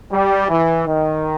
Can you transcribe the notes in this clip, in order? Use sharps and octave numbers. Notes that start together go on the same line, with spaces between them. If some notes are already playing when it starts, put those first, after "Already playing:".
G3
E3
D#3